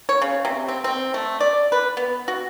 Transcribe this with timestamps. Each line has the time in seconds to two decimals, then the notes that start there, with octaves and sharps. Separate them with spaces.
0.09 C#5
0.22 C#3
0.45 C3
0.68 C4
0.84 C4
1.14 A3
1.40 D5
1.72 B4
1.97 B3
2.28 F#4